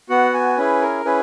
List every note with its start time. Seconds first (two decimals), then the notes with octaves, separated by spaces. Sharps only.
0.09 B3 F#4 F#5
0.34 G#5
0.57 C#4 E4 G#4 B4
0.82 A#4
1.05 C#4 E4 G#4 B4